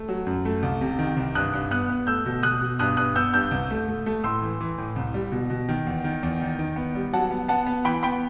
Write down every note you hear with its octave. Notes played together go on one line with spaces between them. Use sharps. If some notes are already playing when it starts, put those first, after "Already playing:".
Already playing: A3
F#3
F#2
A3
C2
C3
D#3
C2
G2 D#6 F#6
G2
B3 D#6 F#6
B3
A3 E6 G6
B2
B2 D#6 F#6
B2
G2 D#6 F#6
G2 D#6 F#6
B3 E6 G6
G2 E6 G6
C2
A3
A3
A3
A2 C6 E6
E3
E3
A2
C2
G3
B2
B2
D#3
E2
D#3
E2
D#3
D#3
B3
G3
F#3 F#5 A5
B3
B3 F#5 A5
B3
E3 G5 B5
B3 G5 B5